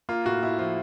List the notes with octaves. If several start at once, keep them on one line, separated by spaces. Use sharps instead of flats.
A#3 F4
A2 F#4
A2 E4
F3 F4